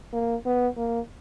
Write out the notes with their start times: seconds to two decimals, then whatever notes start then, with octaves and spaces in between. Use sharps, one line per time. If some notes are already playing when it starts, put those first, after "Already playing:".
0.13 A#3
0.46 B3
0.77 A#3